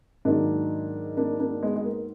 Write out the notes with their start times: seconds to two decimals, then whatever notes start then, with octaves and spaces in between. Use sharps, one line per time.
0.25 G#2 D#3 F#3 A#3 D4
1.17 A#3 D4
1.40 A#3 D4
1.62 G#3 B3
1.76 G#3
1.85 A#3